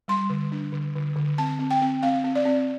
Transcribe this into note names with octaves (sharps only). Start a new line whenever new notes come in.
G3 C6
D3
D4
D3
D3
D3
C4 A5
C4
G5
C4
C4 F5
C4
D5
C4